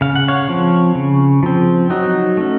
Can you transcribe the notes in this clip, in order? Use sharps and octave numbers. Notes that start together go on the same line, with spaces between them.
C#3 F5
F#5
C#5 F5
F3 C4
C#3
F3 C4
F#3 D#4 F#4
A3 C#4